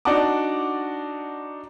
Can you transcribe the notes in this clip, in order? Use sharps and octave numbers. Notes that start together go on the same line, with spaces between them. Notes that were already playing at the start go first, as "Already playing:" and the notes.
D4 D#4 F#4 F#5 A5 D6